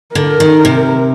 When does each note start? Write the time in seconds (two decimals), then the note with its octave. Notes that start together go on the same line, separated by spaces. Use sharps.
0.15 D3 A#4
0.40 D#3
0.65 C3